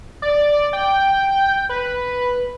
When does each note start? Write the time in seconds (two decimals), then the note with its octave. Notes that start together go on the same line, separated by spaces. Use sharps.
0.22 D5
0.73 G5
1.69 B4